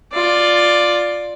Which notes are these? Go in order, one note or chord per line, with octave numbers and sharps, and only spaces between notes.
F4 D5